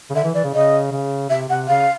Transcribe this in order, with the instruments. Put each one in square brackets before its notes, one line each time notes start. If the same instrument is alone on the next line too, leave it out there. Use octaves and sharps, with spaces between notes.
[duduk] C#3
[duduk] D3 [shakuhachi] E5
[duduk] E3
[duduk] E3 [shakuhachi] D5
[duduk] C#3
[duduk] C#3 [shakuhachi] D#5
[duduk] C#3
[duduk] C3 [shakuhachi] E5
[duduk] C3 [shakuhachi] F#5
[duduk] C#3 [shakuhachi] F5